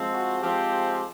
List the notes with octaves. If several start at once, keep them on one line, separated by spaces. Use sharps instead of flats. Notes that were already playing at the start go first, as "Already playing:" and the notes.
Already playing: F3 G#3 C4
F#4
F3 G#3 C4 F4 G4